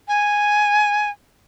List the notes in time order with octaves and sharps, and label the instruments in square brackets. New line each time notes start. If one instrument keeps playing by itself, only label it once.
[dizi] G#5